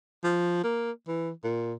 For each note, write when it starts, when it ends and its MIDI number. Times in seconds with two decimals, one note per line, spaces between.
0.24 0.63 53
0.64 0.91 58
1.08 1.30 52
1.44 1.73 46